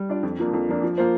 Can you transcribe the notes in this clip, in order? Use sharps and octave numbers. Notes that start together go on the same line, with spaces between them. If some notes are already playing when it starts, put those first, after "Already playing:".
Already playing: G3
D4 F4 D5
F2
F3 A#3 D4
F2
F3 A#3 D4
F3
A#3 F4 C5